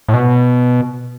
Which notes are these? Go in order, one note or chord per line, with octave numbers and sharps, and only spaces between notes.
A2
B2